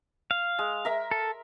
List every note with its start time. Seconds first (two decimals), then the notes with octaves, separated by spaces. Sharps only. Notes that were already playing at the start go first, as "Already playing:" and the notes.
0.31 F5
0.59 G#3
0.85 A#4 E5 A#5
1.11 A4